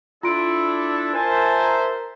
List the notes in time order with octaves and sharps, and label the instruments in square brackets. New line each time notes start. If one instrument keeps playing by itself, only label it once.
[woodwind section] D4 E4 A4 [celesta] F4 C6 D7
[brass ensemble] A#4 C5 E5 [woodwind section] G#5 A5